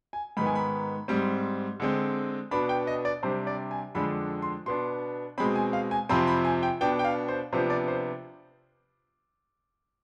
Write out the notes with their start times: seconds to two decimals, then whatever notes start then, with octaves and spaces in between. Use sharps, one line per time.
0.13 G#5
0.37 G#2 D#3 B3 B5
0.46 G#5
0.55 B5
1.08 G#2 G3 C4
1.80 D3 G#3 C4
2.51 B2 B3 D4 B5
2.69 G5
2.87 D#5
3.05 D5
3.23 C3 G3 D4 C5
3.47 D5
3.71 G#5
3.95 F2 D3 G#3 D4 B5
4.42 C6
4.66 B2 B3 D4 C6
5.38 B2 G#3 C4 B5
5.56 G#5
5.73 F5
5.91 G#5
6.09 F2 C3 F3 C4 B5
6.27 B5
6.45 G#5
6.63 G5
6.81 B2 B3 D4 G5
6.99 G5
7.04 F5
7.28 C5
7.53 C3 F3 B3 D4 C5
7.70 D5
7.88 C5